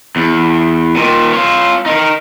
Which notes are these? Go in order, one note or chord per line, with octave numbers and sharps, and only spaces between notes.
E2
A#2 D#3
F4 C#5
D#4 A#4